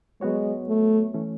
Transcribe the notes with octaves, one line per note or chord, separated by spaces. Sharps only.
F#3 G#3 B3 F#4 C#5
A3
E3 A3 C#4